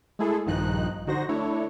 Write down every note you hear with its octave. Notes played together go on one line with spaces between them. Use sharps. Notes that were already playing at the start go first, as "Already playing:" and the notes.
G#3 A3 E4 G#4 A4
A#1 G2 D#3 F3 D#4 F#6
D3 D#4 F#4 C5 A#6
A3 D4 E4 C#5